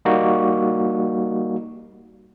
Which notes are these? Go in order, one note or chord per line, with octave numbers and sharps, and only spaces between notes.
G3 A#3 D#4 F#4